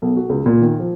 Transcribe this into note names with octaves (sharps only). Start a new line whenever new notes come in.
B1
F#4
C#2
A#2
D#3
F3